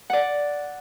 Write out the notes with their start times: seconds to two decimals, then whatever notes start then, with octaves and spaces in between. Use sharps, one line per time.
0.10 D5 F#5